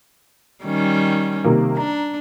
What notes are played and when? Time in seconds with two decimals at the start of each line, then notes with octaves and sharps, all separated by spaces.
0.64 D#3 G3 C#4
1.44 C3 D#3 A#3
1.77 D4 A#5